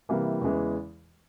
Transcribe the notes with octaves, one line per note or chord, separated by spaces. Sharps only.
C3 E3 G3 A#3
E2 C#3 E3 G#3